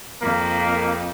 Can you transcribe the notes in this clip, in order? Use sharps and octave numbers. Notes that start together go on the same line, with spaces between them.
F2 A#3